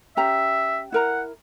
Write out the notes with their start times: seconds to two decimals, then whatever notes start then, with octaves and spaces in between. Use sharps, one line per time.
0.17 C#4 G4 E5 A#5
0.92 E4 A#4 F#5 A#5